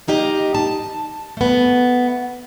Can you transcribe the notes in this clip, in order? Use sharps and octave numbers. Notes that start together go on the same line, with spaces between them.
A#3 D#4 G4 D#5
A5
A3 B3